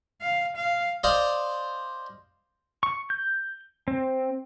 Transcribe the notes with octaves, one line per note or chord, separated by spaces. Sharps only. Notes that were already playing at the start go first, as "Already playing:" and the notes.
F5
F5
C5 D5 D#5 F5
C#6
G6
C4